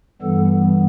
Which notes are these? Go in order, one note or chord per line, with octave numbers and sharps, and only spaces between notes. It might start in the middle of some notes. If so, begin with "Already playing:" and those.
G2 E3 G3 B3 A4